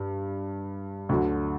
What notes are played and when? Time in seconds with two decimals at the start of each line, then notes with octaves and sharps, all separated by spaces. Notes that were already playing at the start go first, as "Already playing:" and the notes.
Already playing: G2
1.09 D2 D3 F#3